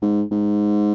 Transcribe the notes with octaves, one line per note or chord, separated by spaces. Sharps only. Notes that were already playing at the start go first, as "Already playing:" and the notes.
G#2
G#2